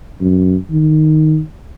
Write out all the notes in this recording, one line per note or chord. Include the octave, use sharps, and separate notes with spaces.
F#2
D#3